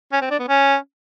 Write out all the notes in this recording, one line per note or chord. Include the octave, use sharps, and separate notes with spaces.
C#4
C4
D4
B3
C#4